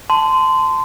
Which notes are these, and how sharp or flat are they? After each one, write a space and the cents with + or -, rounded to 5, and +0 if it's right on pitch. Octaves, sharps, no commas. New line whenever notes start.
A5 +0 C6 -20